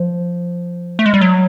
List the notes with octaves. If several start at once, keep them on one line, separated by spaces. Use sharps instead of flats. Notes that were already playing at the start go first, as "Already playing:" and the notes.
Already playing: F3
A3
G#3
G3
F#3